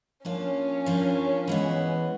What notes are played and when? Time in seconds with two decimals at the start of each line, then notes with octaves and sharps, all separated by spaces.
0.24 F3 A#3 C#4 D4 F4
0.86 F3 A#3 D4 F4
1.47 E3 G#3 B3